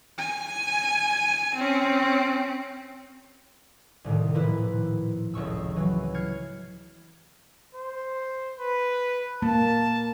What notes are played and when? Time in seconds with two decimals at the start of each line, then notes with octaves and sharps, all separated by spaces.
0.18 G#5
1.55 C4 C#4
4.04 C2 A2 C3 D#3
4.34 D#1 F3 E4 B4
5.34 F1 C#2 C#6 E6
5.76 E3 F#3
6.14 F6 G#6 C7 C#7
7.75 C5
8.59 B4
9.42 A#3 A5